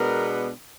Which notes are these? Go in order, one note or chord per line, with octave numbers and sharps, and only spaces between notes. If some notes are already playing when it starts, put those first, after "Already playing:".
Already playing: B2 G#3 B3 D4 A#4